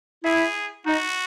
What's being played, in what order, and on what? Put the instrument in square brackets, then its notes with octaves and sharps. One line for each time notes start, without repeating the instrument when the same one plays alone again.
[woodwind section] E4 [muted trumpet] G#4
[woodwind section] D#4 [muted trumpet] F#4